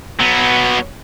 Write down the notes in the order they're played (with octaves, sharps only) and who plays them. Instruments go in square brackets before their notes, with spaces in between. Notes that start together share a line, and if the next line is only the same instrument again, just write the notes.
[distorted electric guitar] F#3 B3